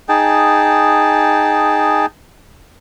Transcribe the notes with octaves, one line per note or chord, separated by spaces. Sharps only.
D#4 G#4 G5 A5